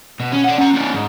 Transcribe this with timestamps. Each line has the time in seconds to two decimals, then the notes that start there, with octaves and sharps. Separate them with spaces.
0.20 B2
0.32 C#4
0.44 D5 F#5
0.58 C#4 A#5
0.73 C4 D4
0.94 G#2